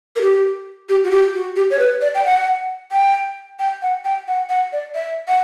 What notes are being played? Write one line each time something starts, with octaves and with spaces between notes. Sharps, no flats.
A#4
G4
G4
F#4
G4
F#4
G4
C#5
B4
D5
G5
F#5
G5
G5
F#5
G5
F#5
F#5
D5
E5
F#5